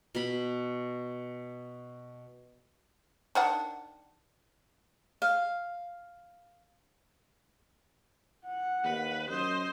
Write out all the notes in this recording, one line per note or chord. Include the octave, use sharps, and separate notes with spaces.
B2 B5
D#3 D4 F#5
F5
F#5
D#2 B4
F#2 C5 D#5